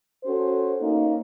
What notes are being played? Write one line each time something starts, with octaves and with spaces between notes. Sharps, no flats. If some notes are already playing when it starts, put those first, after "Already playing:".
C#4 F#4 A4 C5
A#3 C#4 D#4